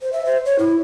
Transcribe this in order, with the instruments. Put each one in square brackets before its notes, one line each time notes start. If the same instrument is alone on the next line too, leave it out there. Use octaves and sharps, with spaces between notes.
[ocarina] C5
E5
C5
C#5
E4